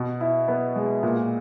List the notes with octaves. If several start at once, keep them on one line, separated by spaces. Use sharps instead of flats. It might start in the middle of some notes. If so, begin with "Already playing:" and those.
Already playing: B2
E4
B3
G#3
A#2